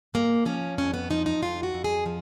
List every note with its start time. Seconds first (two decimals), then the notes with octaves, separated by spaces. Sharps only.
0.14 G#2 A#3
0.46 F3 C#4
0.78 F2 C#4
0.94 B3
1.10 F3 D#4
1.26 D#4
1.42 F2 F4
1.63 F#4
1.74 F2
1.84 G#4
2.06 F3